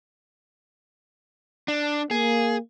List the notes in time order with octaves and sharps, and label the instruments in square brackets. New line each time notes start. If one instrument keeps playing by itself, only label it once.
[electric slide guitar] D4
[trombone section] A#3 [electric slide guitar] G#4